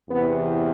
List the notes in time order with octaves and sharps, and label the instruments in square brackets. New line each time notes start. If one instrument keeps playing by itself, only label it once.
[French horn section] E2 C3 E3 B3